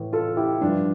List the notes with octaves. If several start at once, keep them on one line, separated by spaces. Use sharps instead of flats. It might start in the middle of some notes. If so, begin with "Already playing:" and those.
Already playing: A2 E3
F4 A4
E4 G4
G2 F3 D4 F4